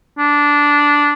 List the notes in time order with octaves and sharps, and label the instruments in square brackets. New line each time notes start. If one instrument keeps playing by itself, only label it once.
[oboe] D4